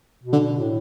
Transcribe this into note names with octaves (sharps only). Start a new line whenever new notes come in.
B2
D3
A2